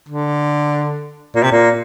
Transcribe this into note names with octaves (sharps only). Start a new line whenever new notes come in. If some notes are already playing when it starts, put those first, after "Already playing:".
D3
A#2
C3
A#2